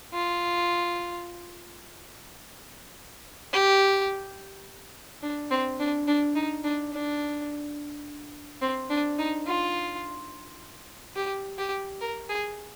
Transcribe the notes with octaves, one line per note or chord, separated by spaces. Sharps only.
F4
G4
D4
C4
D4
D4
D#4
D4
D4
C4
D4
D#4
F4
G4
G4
A#4
G#4